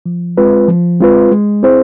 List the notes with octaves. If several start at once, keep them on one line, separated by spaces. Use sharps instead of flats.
F3
G#3 C4 F4 B4
F3
G#3 C4 F4 B4
G#3
C4 E4 G#4 C5